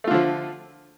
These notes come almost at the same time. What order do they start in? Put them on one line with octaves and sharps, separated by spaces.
A3 F4 D3 F3